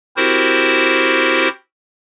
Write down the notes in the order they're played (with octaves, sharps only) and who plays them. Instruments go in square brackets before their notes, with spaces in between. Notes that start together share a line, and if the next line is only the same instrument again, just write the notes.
[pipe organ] C4 E4 F#4 G4 A#4 C5